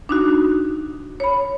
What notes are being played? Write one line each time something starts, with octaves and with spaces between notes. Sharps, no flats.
D4 D#4 F#4
C#5 B5